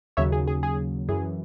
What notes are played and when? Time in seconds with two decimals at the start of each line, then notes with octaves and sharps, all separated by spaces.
0.17 D#2 C#3 F#3 C#5 E5
0.32 G#4
0.47 G#4
0.63 G#4
1.09 F#2 E3 G#4